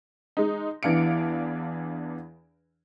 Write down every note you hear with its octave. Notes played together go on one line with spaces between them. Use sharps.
G#3 D#4
E2 E3 D4 F5 C#7 D7